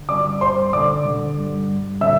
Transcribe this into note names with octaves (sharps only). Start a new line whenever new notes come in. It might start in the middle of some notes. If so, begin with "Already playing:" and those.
Already playing: D3
G2 D5 D6
G2 C5 C6
D3 D5 D6
D3
G2
G2
D3 E5 E6